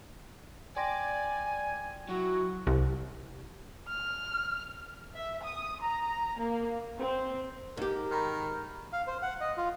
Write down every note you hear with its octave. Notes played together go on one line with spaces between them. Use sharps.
D5 G5 G#5 C6 A#6
F#3 E4 F#4
C2
F6
E5
D#6
A#5
A#3
C4
G#2 G4 A#4
D#3 A#5 B5 F6
F5
C5
F#5
D#5
F4